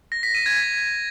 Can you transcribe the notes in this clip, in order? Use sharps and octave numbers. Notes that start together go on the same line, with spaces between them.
A#6
B6
D#7
G#6